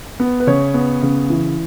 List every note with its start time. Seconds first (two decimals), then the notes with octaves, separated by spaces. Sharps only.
0.20 B3
0.40 B4
0.47 C#3 C#5
0.74 B3
1.02 C#3
1.30 E3